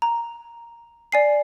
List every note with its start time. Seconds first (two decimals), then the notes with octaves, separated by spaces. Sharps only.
0.02 A#5
1.12 D5 G#5 C7